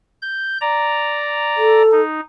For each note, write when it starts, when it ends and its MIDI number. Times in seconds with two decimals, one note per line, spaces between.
0.22 0.58 91
0.61 1.82 74
0.61 1.82 82
1.57 2.01 69
1.92 2.21 63